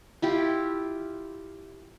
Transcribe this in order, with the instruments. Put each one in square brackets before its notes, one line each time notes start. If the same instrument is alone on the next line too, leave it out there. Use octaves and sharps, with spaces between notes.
[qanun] E4 F4 G4